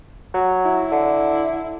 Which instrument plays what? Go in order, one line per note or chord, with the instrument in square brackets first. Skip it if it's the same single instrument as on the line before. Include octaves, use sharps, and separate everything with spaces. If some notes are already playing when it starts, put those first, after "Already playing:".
[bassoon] F#3
[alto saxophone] E4
[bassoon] D3